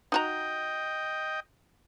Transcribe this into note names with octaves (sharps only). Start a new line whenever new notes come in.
D#4 F#4 D#5 G5 A#5